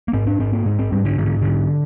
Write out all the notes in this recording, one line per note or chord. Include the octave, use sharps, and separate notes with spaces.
A#3
G#2 C4
D4
G#2 C4
A#3
G#2 G#3
C4
G#2 G3
D3
G#2 D#3
D3
G#2 D3